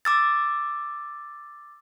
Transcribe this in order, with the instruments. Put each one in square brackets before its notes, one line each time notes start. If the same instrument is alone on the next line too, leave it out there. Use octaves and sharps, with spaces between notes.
[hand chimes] D6 E6 A6